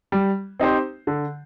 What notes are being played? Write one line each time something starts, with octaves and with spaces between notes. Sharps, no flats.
G3
C4 D#4 G4 C5
D3